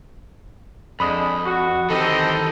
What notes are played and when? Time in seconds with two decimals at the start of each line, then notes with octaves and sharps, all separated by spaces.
1.00 F2 D3 G#3 B5 D#6
1.45 F#4
1.90 D#3 E3 C4 G4 A4 D#5